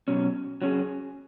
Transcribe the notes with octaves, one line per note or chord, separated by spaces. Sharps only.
B2 F#3 C#4
F#3 C#4 G#4